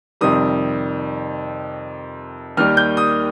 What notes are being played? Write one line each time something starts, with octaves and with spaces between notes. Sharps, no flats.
F2 C3 D#3 G3 D#6
D#2 D#3 G3 F6
G6
D#6